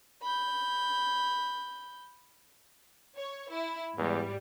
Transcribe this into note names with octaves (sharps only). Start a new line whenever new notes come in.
B5 G6
C#5
E4
E2 G#2 G3